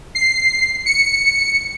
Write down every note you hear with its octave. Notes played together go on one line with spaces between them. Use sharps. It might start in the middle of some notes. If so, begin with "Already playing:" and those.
C7
C#7